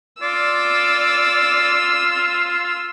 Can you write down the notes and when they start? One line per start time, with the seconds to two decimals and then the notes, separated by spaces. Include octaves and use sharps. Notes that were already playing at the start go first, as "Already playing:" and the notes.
0.22 F4 D5 E6